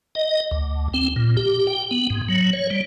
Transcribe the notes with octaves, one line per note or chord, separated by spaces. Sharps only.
D#5
D2
C4
A#2
G4
G5
B3
G#2
F#3
C#5
G3